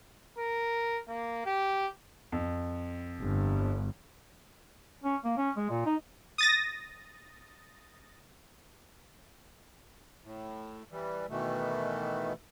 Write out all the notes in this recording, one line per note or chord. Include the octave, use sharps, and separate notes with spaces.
A#4
A#3
G4
F2
G1
C#4
A#3
C#4
G#3
A#2
D#4
D#6 A6 A#6
A2
E3 G3
B2 D#3 E3 A3